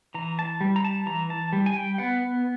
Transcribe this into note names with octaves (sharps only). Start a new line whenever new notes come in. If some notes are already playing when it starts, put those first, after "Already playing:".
E3 A#5
A5
G3
A#5
A5
E3 A#5
A5
G3
G#5
G5
B3 F#5